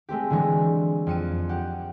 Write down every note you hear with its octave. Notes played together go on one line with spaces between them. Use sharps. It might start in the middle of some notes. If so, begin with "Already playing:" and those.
G#3 A3 C4 G4
D3 E3 F#3 G#3
F2 C#7 D#7
G4 F#5